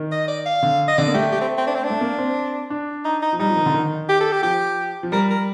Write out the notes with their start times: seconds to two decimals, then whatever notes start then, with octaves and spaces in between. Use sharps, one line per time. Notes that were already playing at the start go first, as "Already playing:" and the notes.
Already playing: D#3
0.12 D#5
0.28 D5
0.45 F5
0.63 D3
0.88 D#5
0.98 D3 D5
1.07 A#3
1.14 A3 G4
1.32 G4
1.41 C4
1.58 C4
1.67 D4
1.75 C4
1.84 D4
1.90 A3
2.01 A#3
2.18 C4
2.70 D4
3.05 D#4
3.22 D#4
3.33 F3
3.39 G3 D#4
3.50 F3
3.56 D#3
3.66 D3
3.74 D#3
4.09 G4
4.21 A4
4.32 G4
4.43 F3 G4
5.03 F3
5.12 G3 A#4
5.30 A#4